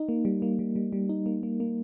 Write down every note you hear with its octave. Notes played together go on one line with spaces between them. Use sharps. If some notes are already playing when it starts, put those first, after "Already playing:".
Already playing: D#4
A#3
G3
A#3
G3
G3
G3
D#4
A#3
A#3
A#3